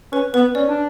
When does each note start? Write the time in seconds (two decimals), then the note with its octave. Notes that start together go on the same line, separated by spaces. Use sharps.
0.13 C#4 B4
0.34 B3 B4
0.55 C#4 D5
0.68 D4